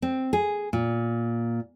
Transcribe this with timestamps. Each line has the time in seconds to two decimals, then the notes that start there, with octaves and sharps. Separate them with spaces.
0.02 C4
0.33 G#4
0.73 A#2